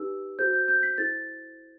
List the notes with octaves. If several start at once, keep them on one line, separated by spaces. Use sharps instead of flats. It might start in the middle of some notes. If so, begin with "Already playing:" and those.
Already playing: D#4 G4 B4 E6
F#4 A4 C5 G6
G6
G6
B6
E4 A4 C5 A6